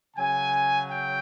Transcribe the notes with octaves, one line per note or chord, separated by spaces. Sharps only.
C#3 F#3 G#5
G5